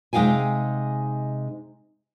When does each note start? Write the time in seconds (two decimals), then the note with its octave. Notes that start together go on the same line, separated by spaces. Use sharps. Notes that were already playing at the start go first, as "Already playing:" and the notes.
0.13 C3 G#3 D#4 F5 G5 G#5